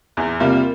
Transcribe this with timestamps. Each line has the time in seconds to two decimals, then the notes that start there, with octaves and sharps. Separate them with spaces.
0.17 E2
0.40 C3 G3 A#3 F4